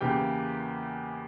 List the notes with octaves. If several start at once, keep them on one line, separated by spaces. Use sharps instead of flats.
E2 C#3 E3 A#3 G4 G5